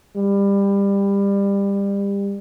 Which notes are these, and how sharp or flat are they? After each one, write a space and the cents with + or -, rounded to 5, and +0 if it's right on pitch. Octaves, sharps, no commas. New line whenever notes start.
G3 +25